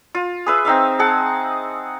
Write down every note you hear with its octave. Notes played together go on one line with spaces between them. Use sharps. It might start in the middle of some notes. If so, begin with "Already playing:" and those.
F4
G#4 B4 E5
C4 D#4 E5 F5
G#4 F#5 A5